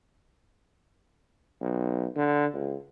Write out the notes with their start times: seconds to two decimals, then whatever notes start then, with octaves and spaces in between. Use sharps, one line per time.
1.61 B1
2.16 D3
2.53 C#2